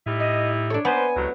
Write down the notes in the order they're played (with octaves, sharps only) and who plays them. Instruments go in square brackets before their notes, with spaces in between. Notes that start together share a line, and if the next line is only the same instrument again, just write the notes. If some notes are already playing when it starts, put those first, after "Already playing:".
[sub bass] A2 [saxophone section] G3 D#4 E4
[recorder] D#5
[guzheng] D4 C#5 [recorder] A4
[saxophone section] A#3 B4 C5 [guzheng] B3 [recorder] G#5
[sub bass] C#2 [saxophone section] A2 C3 F#3